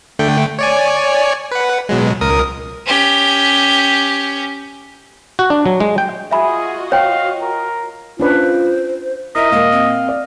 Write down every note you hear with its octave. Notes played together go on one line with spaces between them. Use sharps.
D3 A3 G5
C#5 D5 G#5
B4 F#5
B2 F#3 G#3
C#2 A#4 D#6
C#4 G4
F#4
D4
F#3
G#3
G5
F4 F#4 G#4 D#5 E5 G#5 B5
C#5 F5 G5
A#4
C#4 D4 F4 B4 C5
E4 A#4 D#5 E5
A#2 G#3 A#4 F5
C4
D5